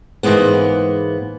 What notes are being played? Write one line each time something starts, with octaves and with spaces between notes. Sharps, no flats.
G#2 E3 G#3 A#3 B3